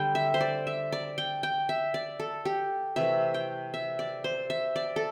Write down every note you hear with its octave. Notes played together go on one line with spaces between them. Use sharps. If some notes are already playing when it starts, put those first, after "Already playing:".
Already playing: D3 G3 G5
E5
C5
D5
E5
D5
G5
G5
E5
D5
A4
G4
C3 E3 A3 E5
G5
E5
D5
C5
E5
D5
A4